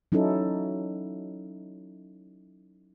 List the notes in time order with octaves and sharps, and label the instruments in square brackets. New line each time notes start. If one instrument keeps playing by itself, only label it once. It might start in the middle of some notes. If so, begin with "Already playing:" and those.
[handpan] F#3 C#4 D#4 E4 A4